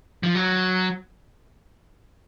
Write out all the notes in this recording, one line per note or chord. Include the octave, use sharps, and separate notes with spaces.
F3
F#3